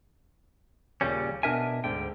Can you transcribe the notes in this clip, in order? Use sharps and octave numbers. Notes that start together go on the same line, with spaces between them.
D#2 A#2 C#3 G3 C#4
B2 E3 D4 A#4 E5 G#5
D2 G#2 D3 G5